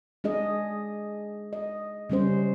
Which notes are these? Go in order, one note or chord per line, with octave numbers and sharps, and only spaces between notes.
G#3 D4 G#4 D#5
D#5
C#3 G3 C#4 C5